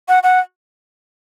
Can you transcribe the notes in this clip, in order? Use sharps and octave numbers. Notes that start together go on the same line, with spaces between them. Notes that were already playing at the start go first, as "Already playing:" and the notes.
F#5
F#5